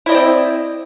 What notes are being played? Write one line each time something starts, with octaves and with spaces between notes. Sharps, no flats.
C4 E4 D5 D#5